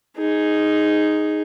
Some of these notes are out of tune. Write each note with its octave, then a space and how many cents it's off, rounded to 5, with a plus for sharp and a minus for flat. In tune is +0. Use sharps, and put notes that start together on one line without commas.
D#4 +0 G#4 +0